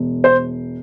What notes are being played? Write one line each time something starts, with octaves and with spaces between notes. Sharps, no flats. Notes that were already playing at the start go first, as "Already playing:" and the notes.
Already playing: E1
C5